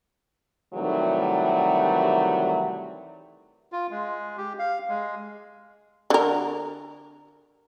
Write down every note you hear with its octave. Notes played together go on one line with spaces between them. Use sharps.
C3 D#3 E3 F#3 G3 A3
F4
G#3
G4
F5
G#3
D3 A#4